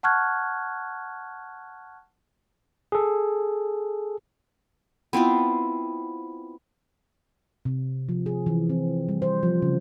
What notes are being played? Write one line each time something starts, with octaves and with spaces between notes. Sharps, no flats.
F#5 A5 C#6 F6 F#6 G#6
G#4 A4
B3 C4 E4 F4
C3
F3
G#4
E3
C4
G3
C5
F3
C#3